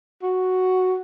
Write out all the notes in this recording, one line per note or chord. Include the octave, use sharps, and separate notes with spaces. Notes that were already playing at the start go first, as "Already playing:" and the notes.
F#4